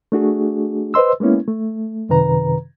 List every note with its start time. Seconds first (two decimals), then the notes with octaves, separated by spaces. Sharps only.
0.12 A3 D4 F#4 G#4
0.94 B4 C5 D#5 C6 E6
1.20 G#3 A#3 B3 C#4 E4
1.48 A3
2.09 F#2 C3 D#3 B4 A#5